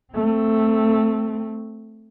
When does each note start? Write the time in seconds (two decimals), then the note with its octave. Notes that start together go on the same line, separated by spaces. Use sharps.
0.13 A3 C4